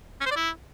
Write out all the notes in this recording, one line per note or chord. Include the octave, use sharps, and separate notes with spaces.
C#4
C5
D5
E4